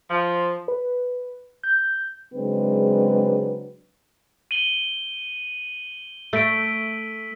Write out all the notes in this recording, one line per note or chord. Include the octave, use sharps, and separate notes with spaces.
F3
B4
G6
C#3 F#3 G#3 C4 D4 B4
D#7 F#7 G7
A3 E6 B6 D7